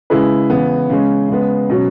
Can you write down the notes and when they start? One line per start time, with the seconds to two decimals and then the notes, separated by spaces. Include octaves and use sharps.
0.10 C#3 G#3 E4 G#4 B4
0.50 C#3 E3 B3
0.89 C#3 G#3 C#4
1.29 C#3 G#3 B3
1.70 B2 F#3 C#4